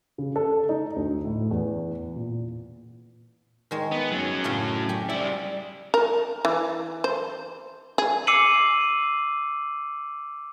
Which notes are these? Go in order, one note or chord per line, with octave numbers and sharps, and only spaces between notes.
C#3
A4
D#4
D2
A2
E2
A#2
D#3 G#3 C#5
B3
F#3 C#4
A2 C#3 A3
G4 G#5
G3 E4 D5
A#4
E3
C5
G#4
D6 E6 C7 C#7 D#7 F#7